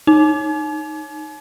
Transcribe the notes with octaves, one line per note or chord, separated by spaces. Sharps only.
D#4